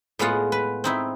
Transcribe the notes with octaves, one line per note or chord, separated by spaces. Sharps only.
A2 G#3 B3 F4 F#5
B4
C4 D#4 E4